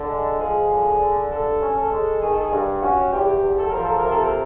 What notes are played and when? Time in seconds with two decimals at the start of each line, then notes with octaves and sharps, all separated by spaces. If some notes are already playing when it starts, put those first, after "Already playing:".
Already playing: D3 A4
0.08 G#3
0.39 F3 G#4
0.69 D3
0.99 D3
1.30 G2 A4
1.60 C#4
1.75 A4
1.91 G#3
2.21 D#3 G#4
2.31 A4
2.41 G#4
2.51 G2
2.82 C#4 F#4
3.12 E2 G4
3.42 E2
3.57 A4
3.71 F3 A#4
3.84 A4
3.98 A#4
4.03 C3
4.10 A4
4.23 A#4